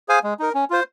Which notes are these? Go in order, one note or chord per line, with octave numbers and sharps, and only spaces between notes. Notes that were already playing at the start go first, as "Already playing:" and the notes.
G#4 C5 F5 G#5
G#3
D#4 A#4
C#4
F4 C5